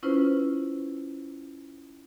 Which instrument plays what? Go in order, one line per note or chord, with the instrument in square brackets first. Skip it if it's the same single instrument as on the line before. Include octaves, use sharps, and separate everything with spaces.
[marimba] C#4 E4 F4 B4 C5